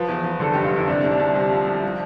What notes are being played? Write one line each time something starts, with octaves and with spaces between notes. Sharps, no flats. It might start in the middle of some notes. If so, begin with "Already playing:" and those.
Already playing: F3 B4
E2
F3
D3 A4
F1 G4
F4
D3 E4
C3 D4
C2
D4
C2
C3
F3
C2
F3